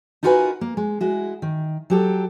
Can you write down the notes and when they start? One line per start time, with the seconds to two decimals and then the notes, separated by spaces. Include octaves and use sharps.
0.23 D#4 F4 F#4 A#4 B4 G#5
0.61 A#3
0.77 G#3
1.01 G#3 E4 F#4
1.42 D#3
1.90 F#3 G4 A4